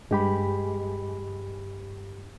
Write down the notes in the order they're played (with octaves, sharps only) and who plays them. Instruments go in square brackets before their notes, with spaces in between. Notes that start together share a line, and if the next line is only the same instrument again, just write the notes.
[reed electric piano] G2 G4 B5 [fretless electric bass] G#3